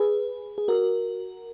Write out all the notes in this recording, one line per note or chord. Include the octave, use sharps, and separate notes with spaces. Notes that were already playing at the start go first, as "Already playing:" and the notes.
Already playing: G#4 B4
G#4
F#4 A#4